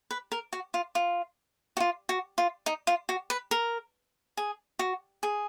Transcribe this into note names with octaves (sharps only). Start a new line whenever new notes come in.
B4
A#4
F#4
F4
F4
F#4
F4
F#4
F4
D#4
F4
F#4
B4
A#4
G#4
F#4
G#4